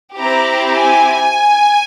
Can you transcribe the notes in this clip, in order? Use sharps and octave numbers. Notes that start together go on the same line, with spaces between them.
C4 E4 G4 A#5
G#5